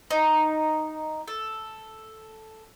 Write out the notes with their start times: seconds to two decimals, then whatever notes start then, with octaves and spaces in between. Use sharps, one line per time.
0.11 D#4
1.27 A4